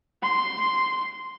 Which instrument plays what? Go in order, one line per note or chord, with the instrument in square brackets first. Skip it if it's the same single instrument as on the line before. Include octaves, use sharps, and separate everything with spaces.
[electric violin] C6